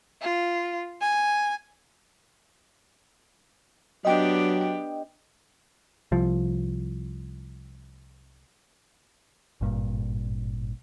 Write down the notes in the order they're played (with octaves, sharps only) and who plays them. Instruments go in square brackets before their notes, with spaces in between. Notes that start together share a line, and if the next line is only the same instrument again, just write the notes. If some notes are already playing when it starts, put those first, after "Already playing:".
[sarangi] F4
G#5
[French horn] F#3 [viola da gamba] B3 D4 G4 [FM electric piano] D#5 G5
[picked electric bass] C2 F3
G#1 G2 A#2